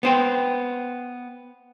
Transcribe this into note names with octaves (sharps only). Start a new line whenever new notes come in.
B3 C5 G5